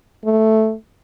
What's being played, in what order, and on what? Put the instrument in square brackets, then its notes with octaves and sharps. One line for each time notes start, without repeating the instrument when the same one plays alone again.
[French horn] A3